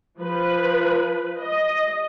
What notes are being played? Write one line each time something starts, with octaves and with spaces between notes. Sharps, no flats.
F3 B4
D#5